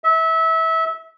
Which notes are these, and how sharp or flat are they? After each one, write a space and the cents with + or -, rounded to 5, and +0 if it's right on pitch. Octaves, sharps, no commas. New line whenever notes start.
E5 -25